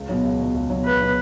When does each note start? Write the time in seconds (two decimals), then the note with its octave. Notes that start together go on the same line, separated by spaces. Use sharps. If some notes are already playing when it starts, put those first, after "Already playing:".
Already playing: C#2
0.09 B2 F#3
0.24 C#2
0.39 B2 F#3
0.54 C#2
0.70 B2 F#3
0.85 C#2 B4
1.00 B2 F#3